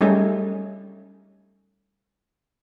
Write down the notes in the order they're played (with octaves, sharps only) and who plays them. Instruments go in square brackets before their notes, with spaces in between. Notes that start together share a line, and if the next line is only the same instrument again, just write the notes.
[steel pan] G3 A3 C#4 D#4 G#4